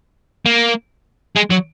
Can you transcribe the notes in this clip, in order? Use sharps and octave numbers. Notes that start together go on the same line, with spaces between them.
A#3
G#3
F#3